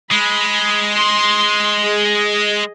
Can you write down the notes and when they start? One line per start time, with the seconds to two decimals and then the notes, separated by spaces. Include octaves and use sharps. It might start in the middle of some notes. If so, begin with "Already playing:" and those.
0.11 G#3 B5
0.96 C6
1.83 G#4 D#5